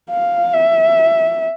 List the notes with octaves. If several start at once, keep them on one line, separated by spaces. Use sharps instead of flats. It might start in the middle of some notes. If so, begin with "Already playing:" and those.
F5
E5